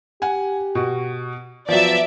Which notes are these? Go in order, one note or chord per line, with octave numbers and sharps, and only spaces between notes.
G4 F#5 G#5
B2 F#4
F3 F#3 B3 D5 E5